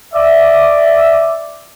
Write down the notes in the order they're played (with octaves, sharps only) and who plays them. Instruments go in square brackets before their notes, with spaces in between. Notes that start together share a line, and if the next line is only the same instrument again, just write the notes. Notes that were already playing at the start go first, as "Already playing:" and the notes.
[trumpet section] D5 E5